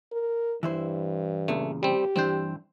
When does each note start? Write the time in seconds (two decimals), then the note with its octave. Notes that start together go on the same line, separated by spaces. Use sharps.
0.12 A#4
0.63 G2 E3 E4 C5
1.48 E2 A#2 C#3 A3
1.83 G3 C4 G4
2.16 G2 E3 C4 D4 C5